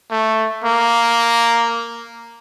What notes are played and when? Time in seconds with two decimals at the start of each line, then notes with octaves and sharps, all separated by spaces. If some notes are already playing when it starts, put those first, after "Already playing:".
0.11 A3
0.64 A#3